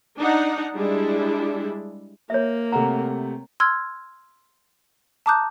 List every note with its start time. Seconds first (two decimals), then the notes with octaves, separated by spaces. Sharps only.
0.18 D4 D#4 F#5
0.75 G3 G#3 D4 E4
2.30 A#3 C#5 E5
2.72 C3 A3 F#5 A#5
3.60 C6 E6 F6 G#6
5.26 A5 A#5 D6 D#6 F#6 G6